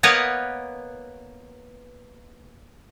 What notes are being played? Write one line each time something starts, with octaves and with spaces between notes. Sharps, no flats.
A#3 B3 A#4 B4 C#5 D#5